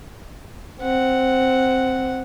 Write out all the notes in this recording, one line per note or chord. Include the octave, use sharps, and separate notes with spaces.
C4 F#5